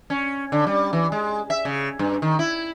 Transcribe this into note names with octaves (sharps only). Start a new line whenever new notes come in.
C#4
D3
G3
E3
G#3
E5
C#3
G2
D#3
E4